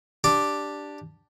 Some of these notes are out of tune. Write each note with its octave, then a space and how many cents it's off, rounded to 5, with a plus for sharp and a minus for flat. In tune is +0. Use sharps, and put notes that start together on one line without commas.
D4 +0 G4 +0